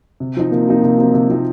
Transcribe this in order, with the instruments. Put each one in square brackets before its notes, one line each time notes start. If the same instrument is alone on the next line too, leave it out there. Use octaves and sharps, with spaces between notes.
[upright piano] C3
F3 C4 D#4
[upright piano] C3 [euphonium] A#3
[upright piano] F3 C4 D#4
C3
F3 C4 D#4
C3
F3 C4 D#4